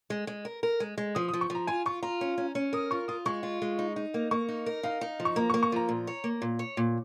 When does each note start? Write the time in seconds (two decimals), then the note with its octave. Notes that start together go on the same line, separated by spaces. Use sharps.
0.10 G#3
0.27 G#3
0.45 A#4
0.63 A#4
0.80 G#3
0.98 G#3
1.15 F3 D#6
1.28 D#6
1.33 F3
1.41 C#6
1.50 F3
1.55 A#5
1.67 F4 G#5
1.86 F4 C#6
2.03 F4 A#5
2.21 C#4
2.38 C#4
2.55 C#4
2.73 A#4 D#6
2.91 F4 C#6
3.08 F4 D#6
3.26 G#3 C#6
3.43 F4
3.62 G#3
3.79 D#4
3.96 D#4
4.14 A#3
4.31 A#3 C#6
4.49 D#4
4.66 A#4
4.83 D#4 F5
5.01 D#4
5.20 F3
5.25 C#6
5.36 A#3 A#5
5.50 C#6
5.54 A#3
5.63 C#6
5.72 F3 A#5
5.89 A#2
6.07 C#5
6.24 A#3
6.42 A#2
6.59 C#5
6.77 A#2